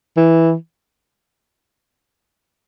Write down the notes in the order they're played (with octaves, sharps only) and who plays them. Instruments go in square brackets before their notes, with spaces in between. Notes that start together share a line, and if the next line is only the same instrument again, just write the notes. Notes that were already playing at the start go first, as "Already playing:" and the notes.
[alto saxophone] E3